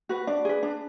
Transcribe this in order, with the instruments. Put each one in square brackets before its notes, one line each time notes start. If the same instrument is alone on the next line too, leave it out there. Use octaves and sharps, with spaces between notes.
[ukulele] F#4 B4
D4 D5
G#4 B4
D4